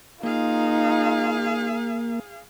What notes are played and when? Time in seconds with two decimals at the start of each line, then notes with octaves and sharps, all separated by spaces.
0.23 A#3 D#4 F4 G#4 F5